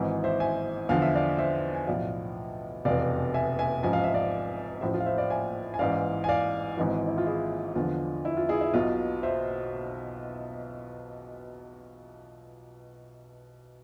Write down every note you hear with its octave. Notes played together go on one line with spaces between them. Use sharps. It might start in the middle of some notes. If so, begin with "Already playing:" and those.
Already playing: G#1 G#2 E3
C5 E5
E5 G#5
E2 D3 F3 F5
E5
D5 F5
C5 E5
G#5
B1 A2 F3 D5 F5
F1 E2 B2 D5 F5
E5 G#5
E5 G#5
A1 G#2 F3 G#5
F5
E5
D5 F5
A1 A2 F3 C5 E5
F4
F5
C5 E5
D5 F5
E5 G#5
G#5
A1 G#2 E3 D5 F5
G#5
D5 F5
G#1 G#2 E3
E4
F4
E4 G#4
E2 D3 F3 F4
E4
F4
E4 G#4
E4
B1 B2 F4
C5 E5